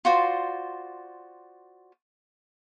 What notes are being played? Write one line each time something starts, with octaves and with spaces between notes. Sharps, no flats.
F4 F#4 C5 D5